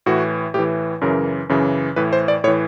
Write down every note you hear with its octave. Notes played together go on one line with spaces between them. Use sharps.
A2 E3 F#4
A2 E3 G4
F#2 C#3 E3 A#4
F#2 C#3 E3
A2 E3 B4
C5
D5
A2 E3 C#5